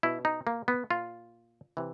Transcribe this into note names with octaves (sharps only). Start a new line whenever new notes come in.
B2 E4
D#4
A#3
B3
A#2 F4
C3 E3